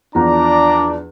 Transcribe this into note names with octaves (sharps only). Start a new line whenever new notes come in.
E2 F3 D4 D5 A#5